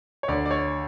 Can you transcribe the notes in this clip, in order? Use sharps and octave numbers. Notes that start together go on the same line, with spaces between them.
C#5
D2 D5
D5
C#5